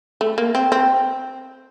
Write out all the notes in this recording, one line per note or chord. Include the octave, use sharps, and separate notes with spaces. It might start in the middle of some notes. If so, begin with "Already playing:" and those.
A3
A#3
C4
C4